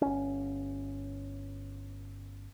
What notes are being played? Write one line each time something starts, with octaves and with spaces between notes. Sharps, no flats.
G1 C#4